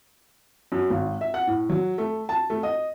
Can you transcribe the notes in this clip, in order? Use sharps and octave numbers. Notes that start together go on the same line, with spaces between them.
F#2
G#1
E5
F#5
A2
F#3
A3
A5
A3
D#5